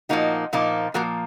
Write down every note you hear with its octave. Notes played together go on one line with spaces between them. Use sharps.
A#2 F3 A#3 D#4 F#4
A#2 F3 A#3 D#4
A#2 F3 A#3 F#4 A#4